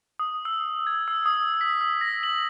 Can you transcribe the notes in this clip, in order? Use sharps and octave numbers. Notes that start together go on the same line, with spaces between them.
D#6
E6
G#6
E6
D#6
B6
E6
A#6
F#7